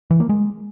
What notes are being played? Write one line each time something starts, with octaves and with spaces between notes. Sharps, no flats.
E3
A#3
G#3